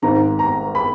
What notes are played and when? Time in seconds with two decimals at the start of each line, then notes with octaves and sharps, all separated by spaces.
0.02 G#1 G#2 D#3 A#5
0.39 A#5
0.75 B5